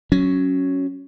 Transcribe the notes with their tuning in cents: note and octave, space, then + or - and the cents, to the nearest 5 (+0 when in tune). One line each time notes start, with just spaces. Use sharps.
F#3 +0 C#4 +0